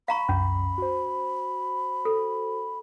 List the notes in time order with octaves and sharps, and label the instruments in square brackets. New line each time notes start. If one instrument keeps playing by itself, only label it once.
[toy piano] F5 A#5 C#6 [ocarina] B5
[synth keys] C2 F#2 [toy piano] C#4
[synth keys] F#4 C5
[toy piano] A4